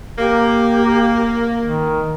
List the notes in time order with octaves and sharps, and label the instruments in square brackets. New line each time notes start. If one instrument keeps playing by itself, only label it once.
[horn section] A#3 [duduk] G4
[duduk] D#3